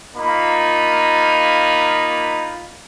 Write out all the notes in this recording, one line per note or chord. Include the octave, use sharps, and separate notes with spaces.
A#3 D#4 F4 B5